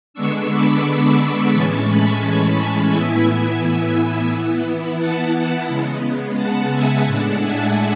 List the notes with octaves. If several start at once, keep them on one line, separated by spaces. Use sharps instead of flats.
D3 G#3 B3 D4 C#6 E6
B5 D6
A2 E3 G#3 C#4 A5 C#6
G#5 B5
A2 E3 B3 E4 E5 G#5
E5 G#5
E3 B3 E4
F#5 A5
C#3 G#3 B3
F#5 A5
E5 G#5
A2 G#3 D4 F#5 A5
E5 G#5